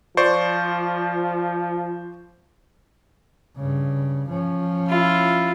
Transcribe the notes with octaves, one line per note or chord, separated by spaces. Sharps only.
F3 C5 D5 C#6
G2 C#3
F3 C#4
E4 F4